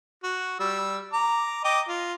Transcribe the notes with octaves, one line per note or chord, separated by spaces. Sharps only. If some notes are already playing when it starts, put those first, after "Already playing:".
F#4
G3 E6
A#5 D6
D#5 G5 D6
F4